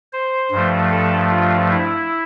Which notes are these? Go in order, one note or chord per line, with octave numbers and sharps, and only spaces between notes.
C5
G2 F3 A3
A4
F4
E4